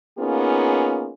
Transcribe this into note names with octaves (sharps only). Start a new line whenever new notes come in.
A#3 B3 C#4 D#4 F4 G#4